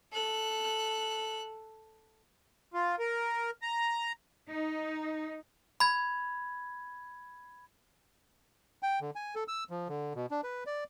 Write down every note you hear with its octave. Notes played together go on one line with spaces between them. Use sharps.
A4 F#6
F4
A#4
A#5
D#4
B5 G#6
G5
D3
G#5
A4
E6
F3
D3
B2
D4
B4
D5